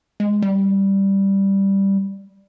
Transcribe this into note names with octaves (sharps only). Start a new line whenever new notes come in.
G#3
G3